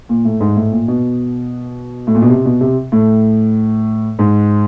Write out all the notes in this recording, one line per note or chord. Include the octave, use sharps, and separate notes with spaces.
A#2
A2
G#2
A2
A#2
B2
A2
A#2
B2
C3
B2
C3
A2
G#2